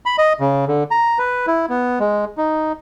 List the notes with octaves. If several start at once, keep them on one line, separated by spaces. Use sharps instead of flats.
B5
D#5
C#3
D3
A#5
B4
E4
B3
G#3
D#4